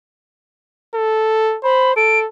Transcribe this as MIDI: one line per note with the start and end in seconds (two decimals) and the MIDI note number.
0.95 1.58 69
1.64 1.95 72
1.64 1.92 83
1.96 2.27 69
1.96 2.19 98